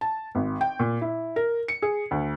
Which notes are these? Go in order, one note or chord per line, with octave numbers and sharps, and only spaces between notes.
A5
G#1
G5
A#2
E4
A#4
C#7
G#4
D2